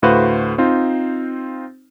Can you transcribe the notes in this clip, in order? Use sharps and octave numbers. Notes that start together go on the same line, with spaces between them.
D2 A2 F#4 B4 C5 F5
C4 D#4 F4 C5